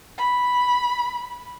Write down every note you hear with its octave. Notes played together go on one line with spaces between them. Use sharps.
B5